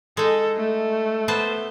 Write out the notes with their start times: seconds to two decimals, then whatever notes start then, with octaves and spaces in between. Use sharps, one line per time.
0.17 G#3 D#4 A4
0.57 A3
1.28 B3 C5 A5